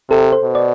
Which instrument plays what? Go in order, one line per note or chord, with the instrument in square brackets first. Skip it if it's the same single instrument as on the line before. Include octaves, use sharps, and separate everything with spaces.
[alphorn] C3 [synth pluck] A4
[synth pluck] C5
[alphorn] B2
[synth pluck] D5